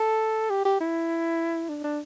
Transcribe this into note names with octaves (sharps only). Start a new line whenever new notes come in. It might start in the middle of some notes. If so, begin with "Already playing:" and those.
Already playing: A4
G4
G4
E4
D4
D4